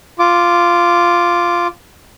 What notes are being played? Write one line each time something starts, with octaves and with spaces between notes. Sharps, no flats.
F4 D6